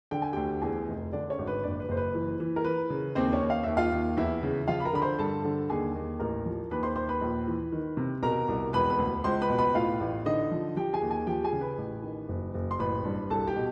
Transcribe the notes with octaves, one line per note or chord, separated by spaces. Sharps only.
D3 G5
G#5
D2 G4 G5
E2 G#4 G#5
F1
D3 D4 D5
C#4 C#5
G#1
B4
F#1 D4 D5
B4
F#1 C5
B4
E3
E3
A#4
E3 B4
C#3
D#2 C4 C5
C#4 C#5
D#2
F5
D#2 E5
F4 F5
D#2
E2 E4 E5
C#3
F3 F4 F5
B5
A#4 A#5
D3 B5
C5 C6
G2 A4 A5
D3
D#2 G#4 G#5
D#2
A1 A#4 A#5
F3
D#2 B4 B5
C5 C6
D#2 C5 C6
B4 B5
A#1
E3
D#3
C3
B2 A#4 A#5
C2
E1 B4 B5
B4 B5
D2
C#2 C5 C6
B4 B5
B2
B4 B5
A2 F4 F5
A1
D3 D#4 D#5
F3
F3 G4 G5
G#4 G#5
D#2
G#4 G#5
F3 G4 G5
G#4 G#5
C#3
B4 B5
A1
D#3
F#1
F#1
C6
A1 B4 B5
G2
C2 A4 A5
G4 G5
B2